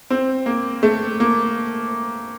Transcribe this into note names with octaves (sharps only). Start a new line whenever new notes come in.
C4
A#3
A3
A#3